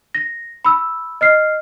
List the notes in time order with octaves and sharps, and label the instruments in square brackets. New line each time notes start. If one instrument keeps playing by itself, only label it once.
[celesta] A#6
B5 E6
D#5 F6 C7